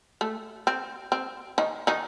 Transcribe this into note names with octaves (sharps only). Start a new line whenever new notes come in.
A3
C4
C4
D#3 D#4
D#3 D#4